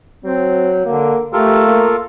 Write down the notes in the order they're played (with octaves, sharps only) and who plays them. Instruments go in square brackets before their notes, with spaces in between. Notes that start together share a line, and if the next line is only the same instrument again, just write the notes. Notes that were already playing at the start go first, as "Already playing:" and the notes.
[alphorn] F#3 [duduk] C4
[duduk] D3 [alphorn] A#3
[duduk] A3 [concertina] F4 A4 A#4 [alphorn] G4
[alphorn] A#3